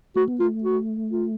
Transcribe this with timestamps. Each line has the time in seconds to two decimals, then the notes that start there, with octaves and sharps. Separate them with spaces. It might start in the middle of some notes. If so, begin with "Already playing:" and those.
0.16 A3 F#4
0.28 B3
0.40 A3 F4
0.64 F#4
1.11 F4